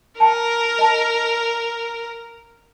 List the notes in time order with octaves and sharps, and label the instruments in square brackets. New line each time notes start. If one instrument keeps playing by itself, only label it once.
[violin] A#4 [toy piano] G5 A5
[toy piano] D#5 A5